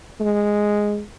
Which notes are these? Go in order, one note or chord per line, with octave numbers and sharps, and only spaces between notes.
G#3